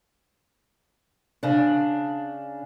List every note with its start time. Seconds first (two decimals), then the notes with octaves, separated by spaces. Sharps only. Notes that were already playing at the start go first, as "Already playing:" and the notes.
1.43 C#3 D4